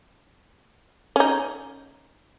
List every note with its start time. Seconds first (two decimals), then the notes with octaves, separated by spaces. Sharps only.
1.16 C#4 D#4